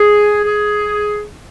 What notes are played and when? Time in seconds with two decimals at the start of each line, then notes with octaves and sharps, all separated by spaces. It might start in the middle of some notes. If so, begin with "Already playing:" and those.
Already playing: G#4
0.44 G#4